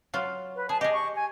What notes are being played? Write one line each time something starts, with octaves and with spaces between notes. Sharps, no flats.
F#3 F4
B4
G#4 A5
G4 G#4 D#5
C#6
G#5